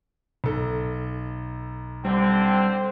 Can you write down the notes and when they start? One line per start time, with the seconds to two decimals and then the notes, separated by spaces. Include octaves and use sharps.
0.44 B1 A4
2.05 D3 G3 C4